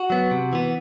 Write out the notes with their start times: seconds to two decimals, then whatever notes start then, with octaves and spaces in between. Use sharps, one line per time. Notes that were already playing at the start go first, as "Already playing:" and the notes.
Already playing: F#4
0.10 F#3 B3
0.31 C3
0.53 E3 B3